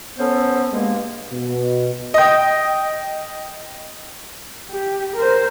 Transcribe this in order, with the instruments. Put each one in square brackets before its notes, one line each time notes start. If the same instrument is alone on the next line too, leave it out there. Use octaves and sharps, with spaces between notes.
[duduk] B3 [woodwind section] C#4 A4 C5
[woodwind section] G2 A#3 [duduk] G#3
[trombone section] B2
[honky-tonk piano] D#5 G5
[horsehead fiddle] G4
A#4 C5